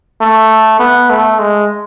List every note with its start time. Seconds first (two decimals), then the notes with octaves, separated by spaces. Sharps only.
0.21 A3
0.79 B3
1.10 A3
1.39 G#3